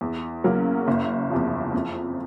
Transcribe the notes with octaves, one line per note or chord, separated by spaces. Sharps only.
E2
C#3 F#3 A#3 C#4
F#1
E2 C3 F3
F2